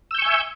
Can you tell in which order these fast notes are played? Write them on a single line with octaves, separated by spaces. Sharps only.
E6 G6 C#6 G#5 E5